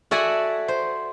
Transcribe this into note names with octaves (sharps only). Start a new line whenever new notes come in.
F#4 A4 D5 E5 F#5 G#5
C5